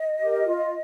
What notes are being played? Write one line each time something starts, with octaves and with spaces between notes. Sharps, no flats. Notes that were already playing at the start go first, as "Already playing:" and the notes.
Already playing: D#5
G4 A#4
F4